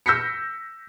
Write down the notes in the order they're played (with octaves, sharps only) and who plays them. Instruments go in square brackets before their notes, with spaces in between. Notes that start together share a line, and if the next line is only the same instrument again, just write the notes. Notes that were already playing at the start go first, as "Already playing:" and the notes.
[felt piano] E6 G6 A#6 B6 C#7